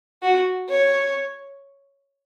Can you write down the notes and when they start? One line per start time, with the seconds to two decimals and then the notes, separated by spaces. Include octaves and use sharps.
0.22 F#4
0.69 C#5